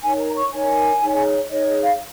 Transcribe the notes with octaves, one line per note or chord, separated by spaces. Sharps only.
D#4 A#4 C#5 G#5
A#5
C#6
D#4 A#4 C#5 G#5
D#4 G#4 C#5
D#4 G#4 C#5 D#5
D#5
F5